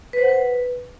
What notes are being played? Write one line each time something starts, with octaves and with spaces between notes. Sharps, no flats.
B4
C5
F#5
B4